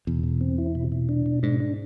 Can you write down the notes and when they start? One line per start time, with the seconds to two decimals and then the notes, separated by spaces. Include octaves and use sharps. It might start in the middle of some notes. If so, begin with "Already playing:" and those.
0.07 E2 B2
0.24 B2
0.41 C4
0.58 E4
0.75 B2
0.92 B2
1.09 D4
1.26 B2
1.43 G#2 D4
1.60 D4